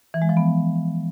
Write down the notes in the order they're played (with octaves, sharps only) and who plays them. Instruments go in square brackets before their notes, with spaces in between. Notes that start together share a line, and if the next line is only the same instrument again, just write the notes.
[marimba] E3
G#3
F3
B3